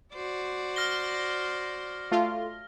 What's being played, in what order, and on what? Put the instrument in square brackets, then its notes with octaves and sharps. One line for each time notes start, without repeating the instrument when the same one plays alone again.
[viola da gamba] F#4 C5 D5
[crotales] F6 A#6 G7
[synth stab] A3 F4